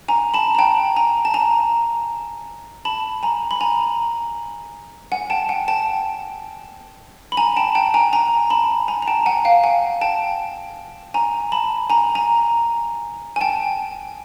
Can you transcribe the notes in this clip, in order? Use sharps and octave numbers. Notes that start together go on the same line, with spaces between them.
G#5 A#5
A5 B5
A#5
G5 A5
G#5 A#5
A5
G#5 A#5
A5 B5
G#5 A#5
B5
G#5 A#5
F#5 G#5
G5 A5
F#5 G#5
G5 A5
B5
G#5 A#5
G5 A5
G5 A5
G#5 A#5
G#5 A#5
A5 B5
G#5 A#5
A#5
G5 A5
F#5 G#5
F5 G5
F#5 G#5
G5 A5
G#5 A#5
A5 B5
G#5 A#5
G#5 A#5
G#5
G5 A5